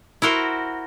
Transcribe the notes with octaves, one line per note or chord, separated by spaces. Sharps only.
E4 F#4 A#4 C5